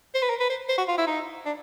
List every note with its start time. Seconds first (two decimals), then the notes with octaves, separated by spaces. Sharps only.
0.15 C5
0.22 B4
0.30 A#4
0.40 B4
0.50 C5
0.69 C5
0.78 F#4
0.88 F4
0.98 E4
1.07 D#4
1.46 D4